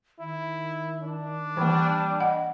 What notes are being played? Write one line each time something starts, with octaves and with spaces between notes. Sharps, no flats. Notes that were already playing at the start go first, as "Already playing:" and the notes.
D#3 E4
D4
E3 G3 A#3
D#5 F#5